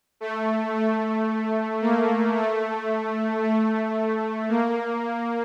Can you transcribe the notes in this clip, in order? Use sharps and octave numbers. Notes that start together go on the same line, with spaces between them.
A3
A3
A#3
A3
A3
A#3